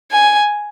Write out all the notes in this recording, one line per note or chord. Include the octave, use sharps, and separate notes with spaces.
G#5